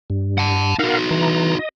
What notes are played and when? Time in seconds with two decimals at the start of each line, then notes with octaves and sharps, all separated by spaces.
0.10 G2
0.38 F#5 A5
0.79 D#4 F#4 A#4 F5 F#5
1.11 E3 A#5
1.59 D#5